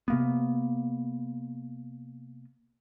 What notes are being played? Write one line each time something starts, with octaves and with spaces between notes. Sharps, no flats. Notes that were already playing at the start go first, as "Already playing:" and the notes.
C3 A#3 B3